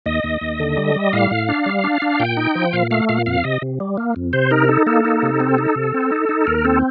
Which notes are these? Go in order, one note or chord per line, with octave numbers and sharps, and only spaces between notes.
D#2 D#5
D#2
D#2
D3
G3
G3
A2 F5
A2
D4
G3
D4
D4
A#2 G5
D#4
F3
A#2 F5
A3 F5
A#2 F5
F2 F5
C3 D#5
C3
G3
A#3
F2
C3 C5
D#4 A#4
D#4 A4
A#3 A4
D#4
C3
C4
D#4
C3
C4
D#4
D#4
D#2 A#4
C4 A4